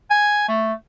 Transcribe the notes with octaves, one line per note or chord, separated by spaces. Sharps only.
G#5
A3